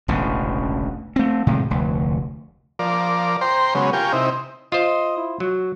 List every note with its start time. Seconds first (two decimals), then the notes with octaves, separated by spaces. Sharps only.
0.08 E1 A1 D2 C#3
1.16 A3 C4
1.47 A2 C3 D#3 G#3
1.70 F1 D2
2.79 F3 A#4 D5
3.41 C5 G5 A#5 C6
3.75 C#3 F#3 G#3 B3 C#4
3.93 F4 G4 A#4 G5 G#5 C#6
4.13 C3 C4 D#4 E4
4.72 F4 C5 D#5
5.17 E4
5.40 F#3 F#4